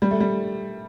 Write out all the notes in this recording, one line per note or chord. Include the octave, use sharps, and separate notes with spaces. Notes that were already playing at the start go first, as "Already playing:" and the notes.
G3
A3
G3